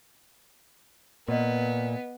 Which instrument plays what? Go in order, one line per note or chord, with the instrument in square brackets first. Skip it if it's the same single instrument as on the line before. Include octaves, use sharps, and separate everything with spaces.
[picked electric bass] A#2 [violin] B3 [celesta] B4 D#5